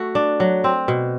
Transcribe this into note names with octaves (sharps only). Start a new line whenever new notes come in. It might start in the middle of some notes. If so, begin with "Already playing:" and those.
Already playing: A3 F#4
D4
F#3
C4
B2